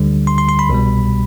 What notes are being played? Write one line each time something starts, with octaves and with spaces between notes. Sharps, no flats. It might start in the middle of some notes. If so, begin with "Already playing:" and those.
Already playing: D2 D3 G3
C6
C6
C6
B5
C2 B2 G3